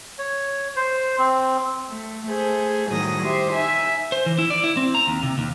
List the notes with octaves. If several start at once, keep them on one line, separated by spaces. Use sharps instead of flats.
C#5
C5
C4
A3
A3 G#4 C5
A2 D#3 F#3 G3 D#6 A#6
G4 C5 E5
D#4 E5 G#5
C5
E3
E4
D5
E4
C4
A#5
D#2
C3
D#2